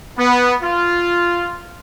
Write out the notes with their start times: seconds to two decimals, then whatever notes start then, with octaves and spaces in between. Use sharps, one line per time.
0.18 B3
0.63 F4